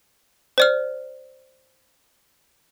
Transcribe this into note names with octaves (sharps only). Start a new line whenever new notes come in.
C5 D5 F6